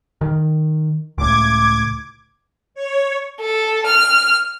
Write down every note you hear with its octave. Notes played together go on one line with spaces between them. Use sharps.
D#3
C#2 A2 D6 G#6
C#5
A4
F6